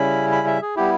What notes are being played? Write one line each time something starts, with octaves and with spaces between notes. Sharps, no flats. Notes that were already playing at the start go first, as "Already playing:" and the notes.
Already playing: C#3 G3 C#4 E4 B5
B5
E5
G#4
G3 B3 E4 G4